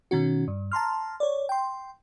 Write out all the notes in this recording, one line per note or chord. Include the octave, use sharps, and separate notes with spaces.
B2 D#3 C#4 F#4
G2
A5 A#5 C6 F6
C#5 D5
G5 C6